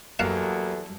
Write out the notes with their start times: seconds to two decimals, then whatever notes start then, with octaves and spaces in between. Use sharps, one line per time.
0.19 E2 F#3 G3 A#3 A4 F5 F#5 A5